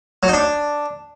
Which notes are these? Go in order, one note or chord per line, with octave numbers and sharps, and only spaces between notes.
F#3
D#4
D4